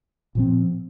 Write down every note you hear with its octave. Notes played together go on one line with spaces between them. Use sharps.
A#2 F3 C4